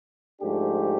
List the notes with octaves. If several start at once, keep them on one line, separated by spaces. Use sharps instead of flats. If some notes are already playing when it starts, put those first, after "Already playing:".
G#2 F3 A3 D4 G4